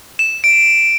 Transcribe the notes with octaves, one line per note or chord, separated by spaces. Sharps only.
E7
D7